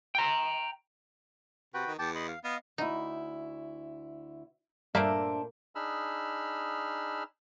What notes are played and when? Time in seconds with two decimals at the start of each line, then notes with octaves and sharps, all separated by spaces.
0.15 G5 A#5
1.74 C3 F#4 B4 G5
1.87 D#3
1.99 E2 G5 A5 D6
2.15 D#5 B5 C6
2.28 F5
2.44 B3 D#5 F5
2.78 D2 D#4 E4
4.95 G2 A#2 A3 A#3 D4 C5 E5
5.75 D4 D#4 G#4 B5 E6 F6